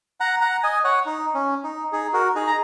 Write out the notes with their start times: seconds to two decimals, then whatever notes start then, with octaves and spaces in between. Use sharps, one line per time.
0.20 F#5 A#5
0.41 F#5 A#5
0.63 D#5 G#5
0.84 C#5 F#5
1.06 D#4
1.34 C#4
1.64 D#4
1.92 D#4 G#4
2.13 F#4 A#4
2.35 D#4 G#4
2.47 A#5